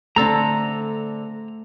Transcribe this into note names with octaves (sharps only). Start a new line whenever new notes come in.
D3 A3 C4 A4 A#5 E6